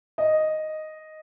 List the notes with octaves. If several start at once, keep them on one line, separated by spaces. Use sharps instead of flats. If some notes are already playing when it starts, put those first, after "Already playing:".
D#5